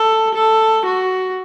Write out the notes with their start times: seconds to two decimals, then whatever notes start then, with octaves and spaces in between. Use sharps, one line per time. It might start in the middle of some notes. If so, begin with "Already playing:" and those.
Already playing: A4
0.34 A4
0.85 F#4